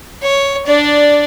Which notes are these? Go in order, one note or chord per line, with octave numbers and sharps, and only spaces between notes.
C#5
D4 D5